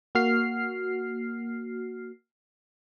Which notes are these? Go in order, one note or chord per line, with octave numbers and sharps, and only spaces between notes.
A#3 F#4 F6 C7